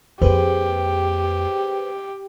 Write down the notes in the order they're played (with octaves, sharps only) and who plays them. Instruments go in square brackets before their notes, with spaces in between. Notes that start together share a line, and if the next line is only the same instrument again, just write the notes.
[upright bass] F2 A#3 [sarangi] G4 [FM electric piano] G#4 B4 C5